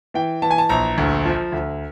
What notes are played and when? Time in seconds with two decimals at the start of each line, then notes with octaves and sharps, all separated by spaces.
0.14 E3 G5
0.42 E3 A5
0.51 G#5
0.58 A5
0.69 A#1 A#5
0.98 D2
1.25 F3
1.52 D2